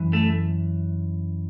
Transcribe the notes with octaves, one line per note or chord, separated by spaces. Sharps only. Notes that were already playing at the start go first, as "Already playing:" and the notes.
Already playing: F#2 E3
A3